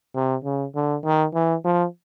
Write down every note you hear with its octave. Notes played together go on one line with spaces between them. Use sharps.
C3
C#3
D3
D#3
E3
F3